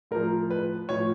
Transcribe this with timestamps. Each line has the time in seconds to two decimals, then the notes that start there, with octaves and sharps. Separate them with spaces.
0.11 A2 F3 A#4
0.50 B4
0.89 A2 F3 C#5